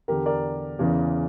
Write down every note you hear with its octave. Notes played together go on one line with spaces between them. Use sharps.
E2 D3 G4 A#4
A#4 D5
E2 C#3 E3